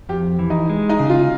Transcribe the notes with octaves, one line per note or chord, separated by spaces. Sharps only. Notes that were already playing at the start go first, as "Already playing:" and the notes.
F2 G4
E3
D#4
G#3
D#4
C#3
F4